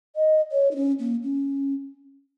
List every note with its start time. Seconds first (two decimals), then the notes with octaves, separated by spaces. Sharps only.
0.16 D#5
0.52 C#5
0.71 D#4
0.76 C#4
0.99 A#3
1.23 C#4